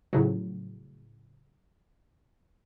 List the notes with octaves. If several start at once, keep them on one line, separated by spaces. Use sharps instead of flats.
A2 C#3 F3 F#3